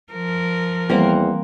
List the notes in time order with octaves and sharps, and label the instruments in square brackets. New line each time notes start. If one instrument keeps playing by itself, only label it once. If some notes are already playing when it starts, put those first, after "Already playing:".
[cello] F3 A#4
[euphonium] E2 [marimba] E3 G3 [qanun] A#3 C4 F#5